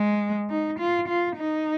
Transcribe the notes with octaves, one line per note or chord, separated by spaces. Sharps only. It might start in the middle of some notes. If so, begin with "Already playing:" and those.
Already playing: G#3
D#4
F4
F4
D#4